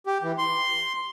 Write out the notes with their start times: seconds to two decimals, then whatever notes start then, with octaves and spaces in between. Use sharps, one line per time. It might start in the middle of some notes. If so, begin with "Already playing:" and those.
0.07 G4
0.23 E3
0.38 C6